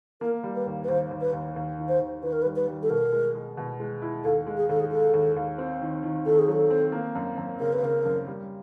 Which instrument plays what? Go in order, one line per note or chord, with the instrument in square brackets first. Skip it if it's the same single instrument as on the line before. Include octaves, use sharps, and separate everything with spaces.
[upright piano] A#3 [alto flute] A#4
[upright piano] G3
[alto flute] B4
[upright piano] D#2
[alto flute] B4
[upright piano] D#2 [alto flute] C5
[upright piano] D#2
[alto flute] B4
[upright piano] D#2
D#2
D#3
[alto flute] C5
[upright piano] D#2
[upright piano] D#3 [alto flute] B4
[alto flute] A#4
B4
[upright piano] G3
[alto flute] B4
[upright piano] G3
[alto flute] A4
[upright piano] B2 [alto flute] A#4
[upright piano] G#3
G#3
B2
G#3
E4
[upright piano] D#2 [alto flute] A4
[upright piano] G#3
[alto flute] G#4
[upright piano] D#2 [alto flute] A4
[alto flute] G#4
[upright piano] G#3 [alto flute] A4
[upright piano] D#2
D#2
C4
D#3
D#3
[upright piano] D#3 [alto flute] A4
[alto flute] G#4
[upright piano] F#3 [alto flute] A4
[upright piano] C4
A#3
F#2
F#2
[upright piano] C#3 [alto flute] A#4
[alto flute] B4
[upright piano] C#3 [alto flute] A#4
[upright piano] F#2
G3